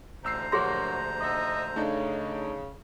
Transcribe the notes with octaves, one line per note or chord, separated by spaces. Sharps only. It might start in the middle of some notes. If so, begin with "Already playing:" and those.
A1 D2 C5 A#5 E6 C7
A#1 F#3 A#3 G4 G#4 F#5 C6 A#6
D#4 D#5 E5
C#3 A3 D4 D#4